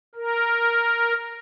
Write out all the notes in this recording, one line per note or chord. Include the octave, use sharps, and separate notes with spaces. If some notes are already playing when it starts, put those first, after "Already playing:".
A#4